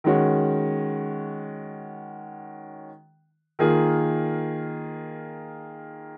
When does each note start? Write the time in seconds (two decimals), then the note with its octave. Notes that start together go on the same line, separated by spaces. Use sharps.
0.04 D#3 G#3 C#4 F#4
3.59 D#3 A#3 F4 G#4